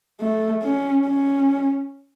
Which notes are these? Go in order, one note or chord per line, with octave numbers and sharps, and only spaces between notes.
A3
C#4
C#4